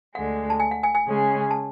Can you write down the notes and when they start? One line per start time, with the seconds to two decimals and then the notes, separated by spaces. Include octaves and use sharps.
0.15 D2 D3 G#3 F#5
0.50 A5
0.60 G#5
0.71 F#5
0.83 G#5
0.95 G#5
1.05 C#3 G#3 C#4 G#4
1.51 A5